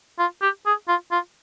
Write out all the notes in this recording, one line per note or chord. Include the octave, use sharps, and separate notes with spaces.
F4
G4
G#4
F4
F4